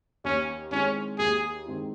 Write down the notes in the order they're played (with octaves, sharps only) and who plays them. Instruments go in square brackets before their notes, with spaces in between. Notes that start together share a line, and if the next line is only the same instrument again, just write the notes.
[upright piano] D#2 [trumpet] C#4
[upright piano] D#3 G#3 C4 E4 [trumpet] C#4
[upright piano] D#2 [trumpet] G#4
[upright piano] D#3 G#3 C4 E4